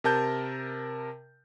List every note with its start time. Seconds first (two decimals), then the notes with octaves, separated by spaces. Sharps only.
0.04 C3 A#4 A5 G6